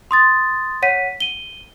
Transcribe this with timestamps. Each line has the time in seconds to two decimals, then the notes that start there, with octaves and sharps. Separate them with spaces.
0.11 C6 D#6 A6
0.82 C#5 F#5 B6 D#7
1.20 D#7 G7